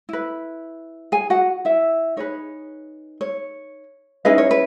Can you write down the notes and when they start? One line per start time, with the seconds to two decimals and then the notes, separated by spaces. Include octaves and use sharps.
0.09 E4 B4
1.12 G#4 G#5
1.30 F#4 F#5
1.65 E4 E5
2.17 D#4 G#4 B4 C#5
3.21 C#5
4.25 C#4 D#4 E4 G#4 B4 D#5
4.38 C#5
4.51 B4